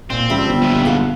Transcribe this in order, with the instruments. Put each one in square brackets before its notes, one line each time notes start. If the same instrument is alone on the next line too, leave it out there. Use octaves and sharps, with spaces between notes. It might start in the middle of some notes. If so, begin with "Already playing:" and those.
[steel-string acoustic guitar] A#2 [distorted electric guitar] C4
[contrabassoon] C#2 [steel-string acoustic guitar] F3 [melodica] G3 E5
[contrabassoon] G1
[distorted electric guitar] C#2 A#2
[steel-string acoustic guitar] A4 F5 F#5